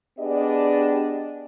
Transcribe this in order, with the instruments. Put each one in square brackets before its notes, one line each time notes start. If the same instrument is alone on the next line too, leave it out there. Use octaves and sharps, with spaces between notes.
[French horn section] B3 D4 G4 G#4 D5 D#5